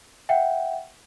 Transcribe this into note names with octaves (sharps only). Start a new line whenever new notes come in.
E5 F#5 G5